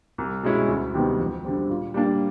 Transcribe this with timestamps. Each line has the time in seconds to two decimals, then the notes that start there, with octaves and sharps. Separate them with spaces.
0.18 C2
0.43 B2 G#3 C#4 E4
0.68 D2
0.94 C3 D#3 G3 B3
1.20 F2
1.45 D3 G3 C4
1.69 A#2
1.94 G3 A#3 D4